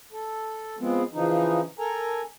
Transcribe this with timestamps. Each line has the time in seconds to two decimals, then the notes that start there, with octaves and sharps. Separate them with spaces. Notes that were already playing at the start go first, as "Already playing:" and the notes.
0.13 A4
0.79 F3 G#3 B3 C4
1.14 C#3 E3 F3 D#4
1.79 A4 A#4 G#5 A#5